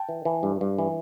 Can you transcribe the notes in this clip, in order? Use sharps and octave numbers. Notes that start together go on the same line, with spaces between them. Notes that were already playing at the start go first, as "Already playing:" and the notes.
Already playing: G5 A5
E3
E3
G2
G2
E3